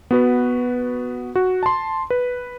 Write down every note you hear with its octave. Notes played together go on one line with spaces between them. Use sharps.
B3 F#4 B4
F#4
A5 C6
B4